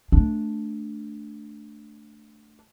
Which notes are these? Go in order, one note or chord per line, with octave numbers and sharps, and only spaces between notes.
A3 D4